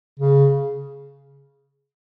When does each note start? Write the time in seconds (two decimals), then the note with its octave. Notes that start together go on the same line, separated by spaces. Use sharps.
0.20 C#3